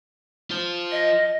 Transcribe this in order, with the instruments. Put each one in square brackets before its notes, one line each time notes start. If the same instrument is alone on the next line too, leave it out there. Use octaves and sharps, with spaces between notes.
[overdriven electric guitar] F4 C5
[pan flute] D#5